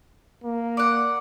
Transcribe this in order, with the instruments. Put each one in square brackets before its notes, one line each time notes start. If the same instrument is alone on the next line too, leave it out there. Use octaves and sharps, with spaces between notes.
[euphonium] A#3
[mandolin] D5 F#5